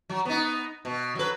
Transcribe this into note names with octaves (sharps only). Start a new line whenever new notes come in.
F#3
B3 D#4
B2
F#3 B4